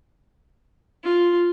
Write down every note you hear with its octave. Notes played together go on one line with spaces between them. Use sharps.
F4